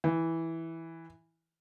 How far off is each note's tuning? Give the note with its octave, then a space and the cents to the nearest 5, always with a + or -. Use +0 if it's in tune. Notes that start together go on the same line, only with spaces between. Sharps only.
E3 -5